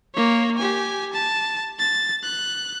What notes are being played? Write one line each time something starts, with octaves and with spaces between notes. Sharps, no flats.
A#3 C#5
G4 G#5
A5
A6
F#6